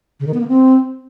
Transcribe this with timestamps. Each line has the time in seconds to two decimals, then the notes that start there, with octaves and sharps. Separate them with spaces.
0.20 C#3
0.27 D#3
0.34 B3
0.41 A#3
0.48 C4